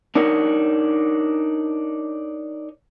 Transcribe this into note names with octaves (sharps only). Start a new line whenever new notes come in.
D4 D#4 A#4 C#5